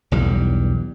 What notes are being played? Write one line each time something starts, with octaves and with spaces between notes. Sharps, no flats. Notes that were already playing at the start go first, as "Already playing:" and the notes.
B1 E2 G2 G3